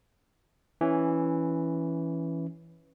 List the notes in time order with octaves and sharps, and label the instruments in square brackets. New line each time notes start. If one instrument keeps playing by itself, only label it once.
[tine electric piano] E3 C#4